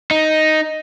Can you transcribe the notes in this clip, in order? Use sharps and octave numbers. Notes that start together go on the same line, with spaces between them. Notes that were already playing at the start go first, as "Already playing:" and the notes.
D#4